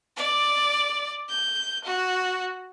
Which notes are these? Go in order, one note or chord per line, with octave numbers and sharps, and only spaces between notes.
D5
G6
F#4